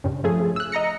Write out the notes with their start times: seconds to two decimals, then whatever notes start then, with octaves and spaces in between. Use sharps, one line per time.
0.04 G2 C#3
0.24 F3 A3 C#4 G#4
0.56 E6 F#6
0.72 D#5 A#5 A#6 C#7